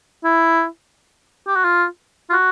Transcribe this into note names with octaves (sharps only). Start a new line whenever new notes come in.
E4
G4
F#4
F4
F4
F#4